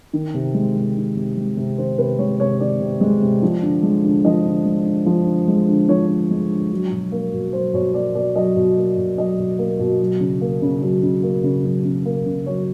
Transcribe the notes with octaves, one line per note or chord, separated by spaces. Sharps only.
D#3
C3
G#3
C3
D#3
C3
G#3
C3
D#3 C5
C3 B4
G#3 C#5
C3 C#5
D#3 D5
C3
G#3
C3
F3
D3
G#3
D3
F3 D#5
D3
G#3
D3
F3
D3
G#3
D3
F3 C#5
D3
G#3
D3
F#3
B2
A#3
B2
F#3 C5
B2 C#5
A#3 D5
B2 D5
F#3 D#5
B2
A#3
B2
F#3 D#5
B2
A#3
B2
F#3
C#3
A#3
C#3
F#3
C#3
A#3
C#3
F#3
C#3
A#3
C#3
F#3 C#5